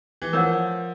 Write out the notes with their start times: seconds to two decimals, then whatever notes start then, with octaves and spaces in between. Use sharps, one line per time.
0.22 E3
0.33 F3 A#4 C#5 F#5